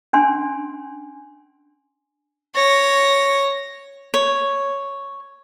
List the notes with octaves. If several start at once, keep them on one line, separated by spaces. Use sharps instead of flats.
C#4 D4 G#5 C6
C#5 A#6
C#5